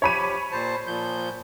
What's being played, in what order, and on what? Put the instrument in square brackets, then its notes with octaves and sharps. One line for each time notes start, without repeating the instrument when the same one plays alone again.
[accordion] F3 G4 [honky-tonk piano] C#5 B5 D#7
[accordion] A#2 C5 A5
A#2 F3 G6